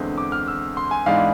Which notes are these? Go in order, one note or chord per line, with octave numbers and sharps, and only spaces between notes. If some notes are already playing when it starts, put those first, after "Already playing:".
Already playing: E2 D3 G#3 C4
D6
F6
E6
C6
G#5
G#2 E3 G#3 B3 D4 F5